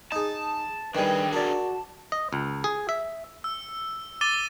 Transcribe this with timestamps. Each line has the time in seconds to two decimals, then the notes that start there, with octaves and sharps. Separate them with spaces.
0.12 D#4 G#4 A5
0.95 D#3 G3 D4 G#4 B4 G5
1.33 F#4 A#4 D5 A5
2.12 D#5
2.33 C#2
2.64 G#4
2.89 E5
3.44 E6
4.21 D6 A6 D#7 G7